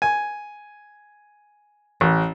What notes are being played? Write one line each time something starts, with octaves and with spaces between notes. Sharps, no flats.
G#5
A1